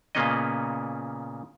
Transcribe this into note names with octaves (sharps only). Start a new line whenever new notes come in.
A#2 C#3 A#3 B3 C#4 D#5